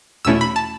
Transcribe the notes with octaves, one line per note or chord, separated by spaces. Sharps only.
E2 B2 A3 C#4 E4 E6
B5
A5